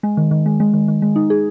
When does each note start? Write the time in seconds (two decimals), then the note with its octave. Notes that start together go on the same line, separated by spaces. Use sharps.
0.03 G#3
0.17 D#3
0.31 D#3
0.46 G#3
0.60 G#3
0.73 D#3
0.88 D#3
1.02 G#3
1.16 D#4
1.30 G#4